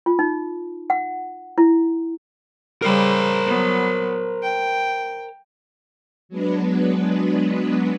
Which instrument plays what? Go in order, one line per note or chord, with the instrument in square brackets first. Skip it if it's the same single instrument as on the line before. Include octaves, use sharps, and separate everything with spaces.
[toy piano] F4
D#4
F#5
E4
[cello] C#3 G3 [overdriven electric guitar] A#4 C5
[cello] F#3 B3
G5
[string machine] F#3 G#3 B3 D4 B4